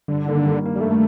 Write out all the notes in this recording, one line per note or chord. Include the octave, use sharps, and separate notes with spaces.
G2 D3
D#3 A#3
G2
D#3 A#3
G3
G2 A3